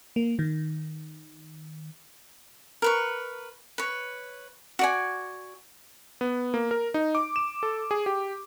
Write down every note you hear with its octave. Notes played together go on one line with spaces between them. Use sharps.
A#3
D#3
A#4 B4 C#6
B4 C#5
F#4 D5 G#5
B3
A#3
A#4
D#4
D6
E7
A4
G#4
G4